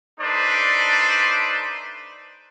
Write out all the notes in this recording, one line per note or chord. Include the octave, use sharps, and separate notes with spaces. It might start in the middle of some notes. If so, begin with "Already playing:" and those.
A3 D4 D#4 B4 C5 D5